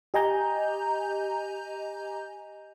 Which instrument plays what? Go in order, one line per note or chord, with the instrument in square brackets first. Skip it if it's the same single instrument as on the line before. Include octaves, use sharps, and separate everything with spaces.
[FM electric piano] G4 D#5 G#5 A#5 G6